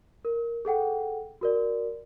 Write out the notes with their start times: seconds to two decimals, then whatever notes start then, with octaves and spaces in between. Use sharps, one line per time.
0.25 A#4
0.65 G#4 A4 F#5 G5
1.41 F#4 A#4 D5